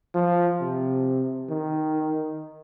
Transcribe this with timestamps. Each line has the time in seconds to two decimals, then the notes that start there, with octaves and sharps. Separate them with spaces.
0.15 F3
0.60 C3
1.49 D#3